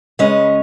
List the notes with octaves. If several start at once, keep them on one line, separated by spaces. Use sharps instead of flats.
C#3 G#3 C#4 B4 D#5